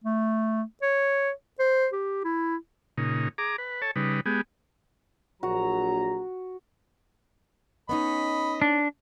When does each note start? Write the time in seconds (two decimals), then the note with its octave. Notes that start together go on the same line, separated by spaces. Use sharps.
0.04 A3
0.82 C#5
1.59 C5
1.93 G4
2.24 E4
2.98 A#2 C#3 D#4
3.38 G#4 A#5 D6
3.58 B4
3.82 A4 C#5 A5
3.96 C#3 G3 D#4 B4
4.26 G#3 B3 G4 G#4
5.43 A#1 F#3 F#4 A#5
7.89 B3 C#4 D#4 D#5 B5
8.62 D4